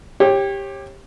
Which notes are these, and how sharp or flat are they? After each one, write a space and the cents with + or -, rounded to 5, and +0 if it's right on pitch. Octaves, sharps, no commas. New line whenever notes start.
G4 +10 C#5 -30